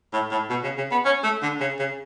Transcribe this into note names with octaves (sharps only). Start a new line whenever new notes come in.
A2
A2
B2
C#3
C#3
B3
C#4
A3
D3
C#3
C#3